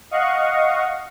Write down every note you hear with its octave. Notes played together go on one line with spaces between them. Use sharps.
D#5 F5 F#5 C#6